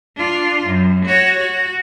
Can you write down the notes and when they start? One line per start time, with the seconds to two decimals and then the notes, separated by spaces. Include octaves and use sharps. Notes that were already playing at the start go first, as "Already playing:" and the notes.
0.16 D4 F4
0.66 F#2
1.06 F#4 C#5
1.39 F#4